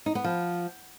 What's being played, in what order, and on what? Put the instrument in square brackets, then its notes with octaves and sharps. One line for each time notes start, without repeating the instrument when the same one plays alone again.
[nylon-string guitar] D#4
B3
F3